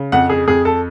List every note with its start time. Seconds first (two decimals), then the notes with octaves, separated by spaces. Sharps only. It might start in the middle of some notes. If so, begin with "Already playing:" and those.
Already playing: C#3
0.12 F2 F#5
0.30 G#4
0.47 F2 G#4
0.65 A4